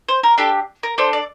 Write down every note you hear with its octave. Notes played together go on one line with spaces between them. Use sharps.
C5
A#4
D4 G4 A4
A#4
D4 A4 C5
D5